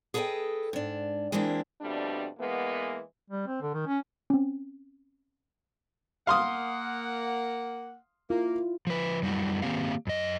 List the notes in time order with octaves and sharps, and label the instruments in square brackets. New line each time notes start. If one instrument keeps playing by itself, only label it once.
[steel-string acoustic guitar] G#4 A4 B4 C5 D#5 G5
G#2 D4
E3 G#3 A#3 C4 D4 E4
[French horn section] F2 B2 G3 A3 D4
E3 G#3 A#3 B3
[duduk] G3
C4
D3
D#3
C#4
[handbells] C4 C#4
[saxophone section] A#3 F#5 [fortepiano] F5 C6 D#6
[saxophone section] A#3 [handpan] E4 F4
[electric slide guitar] F3 B4
F#2 G3 E4 F#4
D#3 F#3 A#3 C4 G4 F5
F#2 D#5